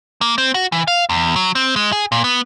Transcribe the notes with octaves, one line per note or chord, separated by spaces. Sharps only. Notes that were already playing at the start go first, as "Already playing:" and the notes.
A#3
C4
F#4
E3
F5
E2
F#3
C4
G#3
G#4
A#2
B3